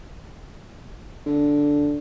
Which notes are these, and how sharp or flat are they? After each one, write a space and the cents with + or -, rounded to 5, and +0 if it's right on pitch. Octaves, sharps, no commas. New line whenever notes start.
D3 -5